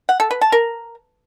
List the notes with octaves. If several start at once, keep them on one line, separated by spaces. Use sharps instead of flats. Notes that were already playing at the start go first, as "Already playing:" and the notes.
F#5
A4
B4
A5
A#4